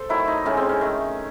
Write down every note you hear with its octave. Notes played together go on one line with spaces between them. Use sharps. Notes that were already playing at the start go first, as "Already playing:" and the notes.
Already playing: A4 C5
D#3 F#3 A3 E4
D#4
A2 G#3 C#4
C4
C#4
D#3 A3